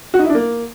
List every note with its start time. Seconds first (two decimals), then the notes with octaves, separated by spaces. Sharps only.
0.14 F#4
0.19 D#4
0.24 E4
0.29 D4
0.35 A#3